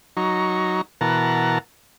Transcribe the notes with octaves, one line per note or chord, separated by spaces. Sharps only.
F#3 D#4 A#5 C#6
B2 E3 A#4 F#5 A5 A#5